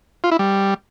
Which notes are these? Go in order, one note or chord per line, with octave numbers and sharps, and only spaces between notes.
F4
E4
G3